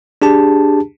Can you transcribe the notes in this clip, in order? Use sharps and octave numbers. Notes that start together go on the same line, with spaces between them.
D4 G4 G#4 A5